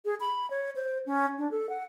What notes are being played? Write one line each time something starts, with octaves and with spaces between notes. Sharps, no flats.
G#4
B5
C#5
C5
C#4
D4
A4
F#5